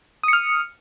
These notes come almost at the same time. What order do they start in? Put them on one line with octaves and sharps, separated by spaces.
D#6 C#7 F6